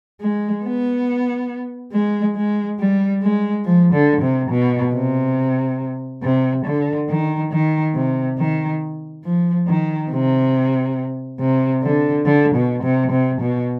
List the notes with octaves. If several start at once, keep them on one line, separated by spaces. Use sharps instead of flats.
G#3
B3
G#3
G#3
G3
G#3
F3
D3
C3
B2
C3
C3
D3
D#3
D#3
C3
D#3
F3
D#3
C3
C3
D3
D3
B2
C3
C3
B2